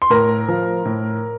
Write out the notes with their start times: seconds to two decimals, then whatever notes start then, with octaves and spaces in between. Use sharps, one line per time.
0.02 C6
0.10 A2 A#4 A#5
0.48 F3
0.85 A2